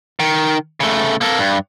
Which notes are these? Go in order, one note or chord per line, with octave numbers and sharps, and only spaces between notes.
D#3
C#3 A3
A#3 A4
G2